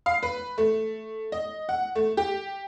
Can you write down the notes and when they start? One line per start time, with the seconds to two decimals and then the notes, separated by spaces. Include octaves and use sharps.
0.06 F5
0.23 B4
0.58 A3
1.32 D#5
1.69 F#5
1.95 A3
2.17 G4